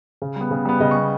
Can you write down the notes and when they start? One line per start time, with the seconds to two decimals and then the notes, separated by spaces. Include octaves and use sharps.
0.22 C#3
0.36 G3 B3
0.51 C#3
0.65 G3 B3
0.80 C#3 D#5
0.91 C#6
0.96 G3 B3